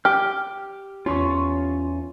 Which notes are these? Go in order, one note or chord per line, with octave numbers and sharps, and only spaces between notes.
G4 F6
E2 C#4 F4 C6 C#6